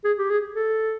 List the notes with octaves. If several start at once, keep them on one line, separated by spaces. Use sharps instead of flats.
G#4
G4
G#4
A4